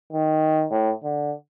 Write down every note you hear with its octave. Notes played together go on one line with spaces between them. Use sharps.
D#3
A2
D3